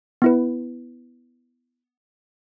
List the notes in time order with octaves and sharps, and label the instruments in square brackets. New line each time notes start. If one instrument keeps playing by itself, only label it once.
[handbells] B3 E4 B4